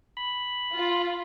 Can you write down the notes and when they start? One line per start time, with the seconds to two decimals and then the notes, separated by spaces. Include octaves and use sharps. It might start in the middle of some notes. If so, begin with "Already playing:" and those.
0.17 B5
0.76 F4